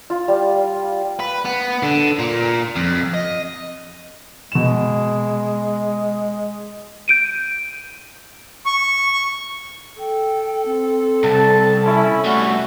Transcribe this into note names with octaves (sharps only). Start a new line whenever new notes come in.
F4
G3
B4
B3
D3
A#2
F2
D#5
B2 G#3 E7
G6 D7 D#7
C#6
A4 G5
C4
C2 A5
C#4 E4 E5
G3 A3 C#4 F#4